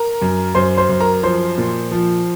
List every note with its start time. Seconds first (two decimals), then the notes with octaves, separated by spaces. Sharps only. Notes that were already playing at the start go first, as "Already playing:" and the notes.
Already playing: A#4 A#5
0.22 F#2
0.55 F#2 C5 C6
0.77 C5 C6
0.89 F#2
1.00 A#4 A#5
1.23 F3 C5 C6
1.58 A#2
1.91 F3